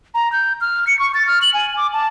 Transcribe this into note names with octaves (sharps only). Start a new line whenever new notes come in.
A#5
G6
F6
C#7
C#6
A6
F6
F#7
G#5
D6
A5